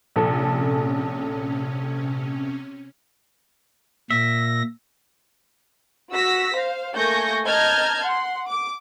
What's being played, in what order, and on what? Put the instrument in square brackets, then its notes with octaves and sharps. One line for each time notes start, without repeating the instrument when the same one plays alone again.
[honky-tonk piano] A#1 A4 [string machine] C3 C#4
[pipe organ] A#2 A#6 [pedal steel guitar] E5
[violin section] F#4 E6 A#6 B6
C5 F5
A3 A#3 G#5 C#6 G6 A#6
D#5 A5 A#5 F6 G6 G#6
F#5 C6
D6